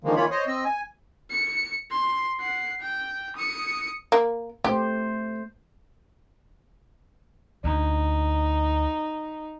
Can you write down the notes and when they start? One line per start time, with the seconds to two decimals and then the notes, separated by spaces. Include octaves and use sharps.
0.04 D3 D#3 F3 G#3 A#3
0.16 D#3 E3 A#3 F4 C#5 B5
0.30 C5 C#5 D#5
0.47 C4 D#5 E6
0.65 G#5
1.30 C#7
1.91 C6
2.40 F#5 C7
2.81 G5
3.36 D#6 C#7
4.12 A#3
4.64 A3 G4 C5
7.64 D2 D#4